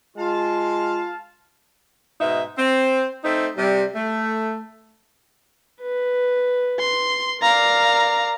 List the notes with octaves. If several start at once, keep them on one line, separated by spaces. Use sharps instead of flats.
G#3 F4 F5 A5
G#2 B2 D#4 E5
C4
A3 C4 D#4 C5
C3 G3
A3
B4
C6
A#4 D5 F5 A#5